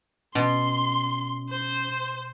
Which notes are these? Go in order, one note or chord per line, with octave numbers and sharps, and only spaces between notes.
B2 C#4 C6
C5